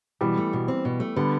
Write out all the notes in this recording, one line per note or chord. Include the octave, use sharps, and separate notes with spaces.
B2 E3 G3
A3
B2
C4
B2
A3
D3 G3 B3